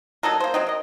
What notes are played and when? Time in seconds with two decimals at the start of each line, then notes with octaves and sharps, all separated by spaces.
0.23 F#3 D#4 A4 A#4
0.40 A#3 C5
0.54 F#3 C4 D#4
0.67 A#4 D#5